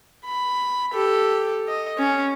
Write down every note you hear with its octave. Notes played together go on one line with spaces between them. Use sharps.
B5
G4 A4
D#5
C#4